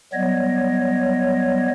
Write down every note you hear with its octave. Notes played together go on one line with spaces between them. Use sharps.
F#3 G3 B3 C#5 D#5